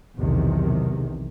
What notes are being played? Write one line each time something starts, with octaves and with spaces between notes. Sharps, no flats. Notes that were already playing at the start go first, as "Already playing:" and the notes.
B1 E2 C3 D#3